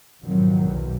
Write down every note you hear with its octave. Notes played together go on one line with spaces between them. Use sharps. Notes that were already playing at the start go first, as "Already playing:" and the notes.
F2 G#2 B2 D#3 F#3
B1 E2